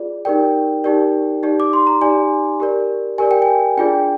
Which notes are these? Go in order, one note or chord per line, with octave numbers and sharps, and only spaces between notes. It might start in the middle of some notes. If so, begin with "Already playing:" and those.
Already playing: F4 G#4 D5
D#4 G4 A#4 D5 G5
D#4 G4 A#4 D5
D#4 G4 D5
D6
C6
A#5
D#4 G4 D5 G#5
G4 A#4 D5
G4 A#4 D5 G#5
G5
G#5
D4 F4 G#4 D5 G5